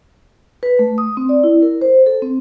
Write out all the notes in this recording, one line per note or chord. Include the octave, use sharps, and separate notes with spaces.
B4
A3
D#6
C4
D5
E4
A#4
C5
A4
C4